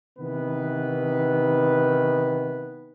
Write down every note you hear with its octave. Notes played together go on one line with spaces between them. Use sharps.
C3 D#3 E3 B3 B4